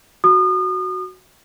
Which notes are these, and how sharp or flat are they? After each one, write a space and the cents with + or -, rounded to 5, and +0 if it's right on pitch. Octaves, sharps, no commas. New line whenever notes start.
F#4 +0 D#6 -35